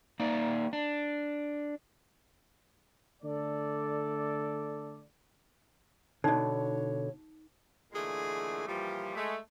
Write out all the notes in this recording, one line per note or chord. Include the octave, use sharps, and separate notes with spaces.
A#3 D#4 D5
D4
D3 A3 A4 D5
B2 D3 D#4 C#5
A#2 D3 E3 G#3 A3 G#4
A#2 E3 F3 G3
G#3 A3